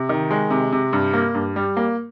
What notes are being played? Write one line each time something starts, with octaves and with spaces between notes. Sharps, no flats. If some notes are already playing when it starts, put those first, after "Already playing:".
Already playing: C3
D#3
G#3
C3
C3
G2
A#3
G2
G3
A#3